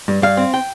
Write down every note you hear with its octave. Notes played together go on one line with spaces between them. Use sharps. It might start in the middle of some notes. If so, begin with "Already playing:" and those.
G2
G2 F5
C4
G5